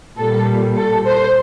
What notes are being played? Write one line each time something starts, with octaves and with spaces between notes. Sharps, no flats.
A#2 G3 A4
A4
C5